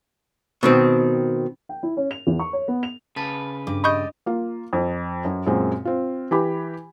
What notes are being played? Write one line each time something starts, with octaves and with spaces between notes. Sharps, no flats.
B2 D#3 C4
G5
E4
C#4
F7
E2
C#6
C#5
B3
F7
C#3 B4 A5
G2 D6
G4 D5 D#5 B5 C#6 G6
A#3 F4
F2
F#2
F#2 A#2 G#3 C4
C4 F4
E3 G4 B5